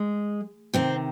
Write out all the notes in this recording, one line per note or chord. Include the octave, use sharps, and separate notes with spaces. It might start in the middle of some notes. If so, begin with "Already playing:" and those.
Already playing: G#3
C3 D#3 C4